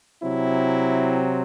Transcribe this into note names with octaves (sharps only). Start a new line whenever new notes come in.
C3 F#3 C4 E4